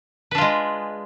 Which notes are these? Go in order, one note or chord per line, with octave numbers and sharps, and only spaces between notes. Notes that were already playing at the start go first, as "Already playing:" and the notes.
G#3 D4 F4 B4